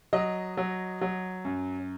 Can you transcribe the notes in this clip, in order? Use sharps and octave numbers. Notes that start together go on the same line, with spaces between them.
F#3 D#5
F#3
F#3
F#2